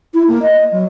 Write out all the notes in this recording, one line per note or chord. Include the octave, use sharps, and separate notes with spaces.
E4
A#3
D#5
F#3